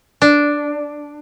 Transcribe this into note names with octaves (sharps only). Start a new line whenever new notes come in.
D4